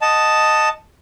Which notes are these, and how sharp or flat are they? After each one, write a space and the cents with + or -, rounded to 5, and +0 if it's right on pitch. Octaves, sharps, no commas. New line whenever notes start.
D#5 +0 F#5 +0 A5 +0